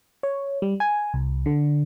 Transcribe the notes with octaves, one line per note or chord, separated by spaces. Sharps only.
C#5
G3
G#5
C2
D3